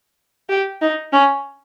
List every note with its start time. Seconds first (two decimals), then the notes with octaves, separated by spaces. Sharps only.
0.49 G4
0.81 D#4
1.12 C#4